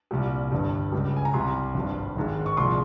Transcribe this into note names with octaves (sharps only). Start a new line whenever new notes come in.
C2 A#2 G3
G1 G2 G3
C#2 C#3 G3
G#5
A#5
C2 C3 G3 C6
G#1 G2 G3
G#1 G#2 D#3 G#3
C#6
C2 A#2 F3 G#3 C6